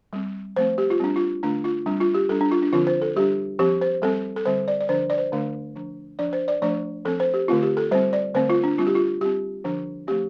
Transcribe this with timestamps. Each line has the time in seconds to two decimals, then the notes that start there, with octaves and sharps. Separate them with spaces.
0.13 G3 C4
0.56 F3 A3 C4 C5
0.78 G4
0.90 F4
1.00 G3 C4 D4
1.16 F4
1.43 D3 A3 D4 F4
1.64 F4
1.86 G3 C4 D4
2.01 F4
2.14 G4
2.29 G3 D4 A4
2.41 D4
2.52 F4
2.62 D4
2.73 D3 F3 C4 F4
2.87 C5
3.02 A4
3.16 G3 D4 G4
3.59 F3 C4 G4
3.81 C5
4.02 G3 C4 A4
4.36 A4
4.45 D3 G3 C4 C5
4.68 D5
4.80 D5
4.89 D3 F3 D4 C5
5.10 D5
5.18 C5
5.32 D3 A3 D4
5.76 F3 D4
6.19 F3 D4 D5
6.33 C5
6.48 D5
6.62 F3 A3 D4 D5
7.05 F3 C4 A4
7.20 C5
7.34 G4
7.48 D3 A3 C4 F4
7.63 G4
7.77 A4
7.91 G3 C4 C5
8.13 D5
8.34 D3 A3 C4 C5
8.50 F4
8.64 D4
8.78 G3 C4 F4
8.87 G4
8.95 F4
9.21 G3 C4 G4
9.64 D3 F3 D4
10.07 F3 A3 C4 G4